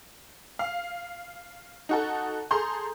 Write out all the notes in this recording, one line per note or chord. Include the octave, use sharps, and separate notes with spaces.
F5
D#4 F#4 A4
G#4 A4 A#5 C6 G6